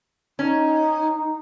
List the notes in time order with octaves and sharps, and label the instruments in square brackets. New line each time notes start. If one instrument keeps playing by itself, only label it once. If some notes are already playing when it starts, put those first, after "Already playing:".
[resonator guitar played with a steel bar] C#4 [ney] D#4